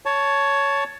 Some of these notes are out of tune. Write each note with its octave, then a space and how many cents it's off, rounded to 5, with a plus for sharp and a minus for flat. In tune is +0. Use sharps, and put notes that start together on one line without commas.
C#5 +10 A5 +0